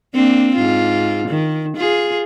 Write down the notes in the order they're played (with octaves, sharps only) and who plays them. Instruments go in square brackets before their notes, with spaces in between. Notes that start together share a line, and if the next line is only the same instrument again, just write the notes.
[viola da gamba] A#3 C4 D4
G#2 F4
D#3
F4 G#4